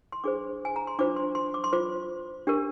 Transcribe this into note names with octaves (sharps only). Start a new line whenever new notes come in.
C6
D4 G#4 C5 D6
G#5
A#5
C6
D4 F4 C5 D6
C6
C6
D6
C6
F4 C5 D6
D4 G4 A#4